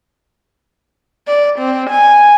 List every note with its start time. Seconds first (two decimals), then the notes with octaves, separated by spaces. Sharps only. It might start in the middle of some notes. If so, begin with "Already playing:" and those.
1.28 D5
1.59 C4
1.90 G#5